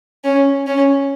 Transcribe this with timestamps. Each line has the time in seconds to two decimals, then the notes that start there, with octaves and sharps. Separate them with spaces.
0.24 C#4
0.67 C#4